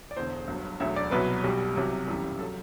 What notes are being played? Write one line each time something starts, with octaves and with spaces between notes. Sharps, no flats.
D5
E1 E2 D3 C5
G1 G2 F#3
E1 D2 D3 F#3 E5
D5
C2 B2 F#3 B4
B1 B2 G3
C2 C3 F#3
G1 F#2 E3 G3
F#3 A4